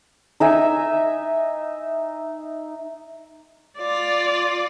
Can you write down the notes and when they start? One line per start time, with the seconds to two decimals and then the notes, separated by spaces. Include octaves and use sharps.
0.40 D#4 E5 G#5
3.78 F4 D5